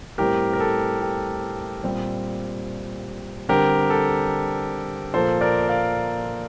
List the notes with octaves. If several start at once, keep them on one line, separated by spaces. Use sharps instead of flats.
A2 G3 C4 G4 A#4
A#4
A4
G4
A#2 G3 C4
D3 G3 C4 G4 A#4
A4
A#2 F3 A#3 A4 C5
A#4 D5
D5 F5